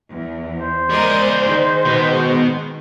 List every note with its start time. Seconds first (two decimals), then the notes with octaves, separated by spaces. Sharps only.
0.11 E2
0.55 C5
0.90 G#3 G#4 A#4 D5 D#5
1.45 D#3 G#3
1.85 B2 B3